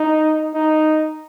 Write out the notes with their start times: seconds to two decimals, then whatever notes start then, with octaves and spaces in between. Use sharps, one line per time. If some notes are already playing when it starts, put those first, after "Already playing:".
Already playing: D#4
0.54 D#4